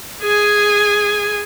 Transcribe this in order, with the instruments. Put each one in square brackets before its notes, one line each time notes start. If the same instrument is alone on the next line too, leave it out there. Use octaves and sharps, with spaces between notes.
[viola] G#4 G#5